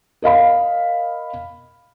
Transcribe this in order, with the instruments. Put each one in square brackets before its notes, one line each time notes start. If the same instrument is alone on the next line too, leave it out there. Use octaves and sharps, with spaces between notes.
[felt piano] A#4 D#5 F5 B5